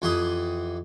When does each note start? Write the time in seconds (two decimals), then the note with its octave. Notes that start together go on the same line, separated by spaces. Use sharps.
0.02 F2 E3 G4 F#5 C6 D#6